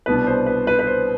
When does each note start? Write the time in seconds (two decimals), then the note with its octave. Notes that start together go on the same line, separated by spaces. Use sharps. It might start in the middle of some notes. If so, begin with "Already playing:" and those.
0.06 C2 B2 B3 D4 B4
0.27 C5
0.46 B4
0.67 B4
0.79 B4
0.87 C5